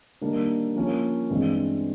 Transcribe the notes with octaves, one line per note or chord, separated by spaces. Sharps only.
D#3 G3 A#3 D4
F3 A#3 C#4 F4
G2 E3 G#3 C4 D#4